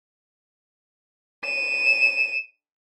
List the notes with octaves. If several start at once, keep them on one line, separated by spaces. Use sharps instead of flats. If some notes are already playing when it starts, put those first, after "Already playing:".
D#7 E7